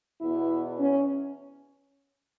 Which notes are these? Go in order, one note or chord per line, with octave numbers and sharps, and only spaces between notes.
E2 B2 E4
C#4